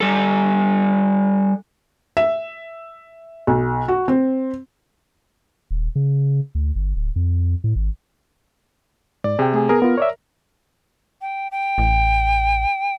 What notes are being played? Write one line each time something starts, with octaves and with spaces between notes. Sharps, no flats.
G3 A4
E5
B1
F#4
C4
D#1
C#3
D2
G1
D1
F2
A2
G#1
G#2 D5
C3 G#4 G5
A3 G#4 G#5
B3 G#4 A#4 A#5
B3 F4
C#5 D5 E5
G5
G5
A1